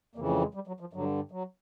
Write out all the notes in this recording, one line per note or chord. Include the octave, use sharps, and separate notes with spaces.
F2 C#3 E3 A#3
A3
G#3
G3
F#3
F3
G2 D3 F#3
F#3